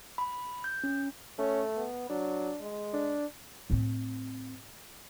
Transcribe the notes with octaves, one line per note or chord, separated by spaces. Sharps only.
B5
G6
C#4
A3 C#4
B3
F#3 D4
G#3
D4
A2 C4